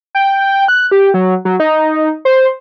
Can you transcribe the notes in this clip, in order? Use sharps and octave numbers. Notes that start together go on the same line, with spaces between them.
G5
F#6
G4
F#3
F#3
D#4
C5